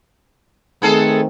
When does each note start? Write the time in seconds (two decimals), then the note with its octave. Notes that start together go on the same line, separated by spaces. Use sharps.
0.82 D#3 A3 B3 C4 G#4 A4